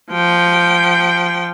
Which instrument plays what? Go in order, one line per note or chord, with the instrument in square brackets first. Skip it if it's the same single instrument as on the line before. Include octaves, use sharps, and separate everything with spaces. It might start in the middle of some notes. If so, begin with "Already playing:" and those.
[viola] F3 G5